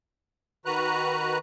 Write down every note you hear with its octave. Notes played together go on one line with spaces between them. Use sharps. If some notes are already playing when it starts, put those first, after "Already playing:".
D#3 F#4 B4 A#5 F#6